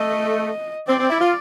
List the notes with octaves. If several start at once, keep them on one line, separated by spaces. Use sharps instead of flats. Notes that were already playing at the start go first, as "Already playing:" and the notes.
Already playing: A3 D#5
C4 D5
C4
E4
F4